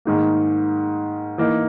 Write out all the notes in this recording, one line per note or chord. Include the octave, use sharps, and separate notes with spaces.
G#2 D#3 A#3
E3 A#3 D#4